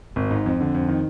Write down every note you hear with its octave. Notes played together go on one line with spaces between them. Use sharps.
G#1
G#2
F2
D3
F2
D#3